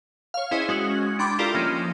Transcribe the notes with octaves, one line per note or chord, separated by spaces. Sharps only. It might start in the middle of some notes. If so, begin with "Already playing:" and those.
C#5 F5
C#4 E4 G#4 C5 D#5
G#3 C#4 F#4
D4 G5 B5 C6 D6
E4 F4 G4 A4 A#4 D5
F3 A#3 C#4 D#4